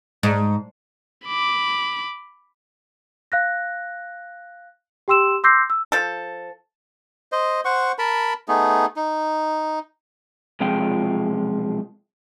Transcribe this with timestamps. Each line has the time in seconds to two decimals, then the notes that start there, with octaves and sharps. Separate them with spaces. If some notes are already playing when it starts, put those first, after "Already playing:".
0.23 G#2
1.25 B5 D6
3.32 F5 F#6 A#6
5.08 G4 G5 C6 E6 E7
5.44 C6 D6 E6 G6 A#6 C7
5.70 E6
5.92 F3 A4
7.32 C5 D#5
7.65 C5 F#5 C#6
7.99 A#4 A5 B5
8.48 A3 B3 D#4 G#4
8.96 D#4
10.60 B1 C3 F3 G#3 F4 G5